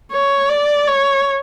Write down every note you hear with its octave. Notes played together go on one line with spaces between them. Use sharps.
C#5
D5
C#5